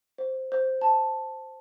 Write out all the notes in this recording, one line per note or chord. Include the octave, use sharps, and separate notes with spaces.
C5
C5
A5